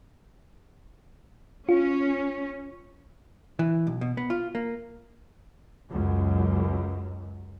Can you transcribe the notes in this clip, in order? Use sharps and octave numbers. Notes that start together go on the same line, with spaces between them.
C#4 F4
E3
B1
B2
B3
F4
A#3
C#2 F#2